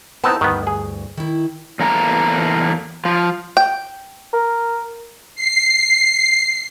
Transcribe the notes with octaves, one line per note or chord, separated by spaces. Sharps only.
B3 C4 D#4 E4 A5
D2 G2 D#3 B3
G#4
D#3 E4
E2 A#3 A4 A5 A#5
F3 F4
G5
A#4
C7